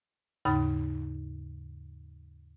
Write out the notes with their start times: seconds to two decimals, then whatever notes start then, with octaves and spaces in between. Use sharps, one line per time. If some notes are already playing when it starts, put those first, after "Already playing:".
0.45 D#2 G#2 C#3 D#4 B5 A6